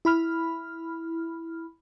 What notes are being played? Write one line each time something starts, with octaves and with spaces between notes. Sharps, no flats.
E4 B5 F6